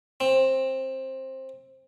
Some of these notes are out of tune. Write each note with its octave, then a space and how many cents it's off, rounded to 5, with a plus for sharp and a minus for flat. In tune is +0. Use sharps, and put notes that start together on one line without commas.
C4 +15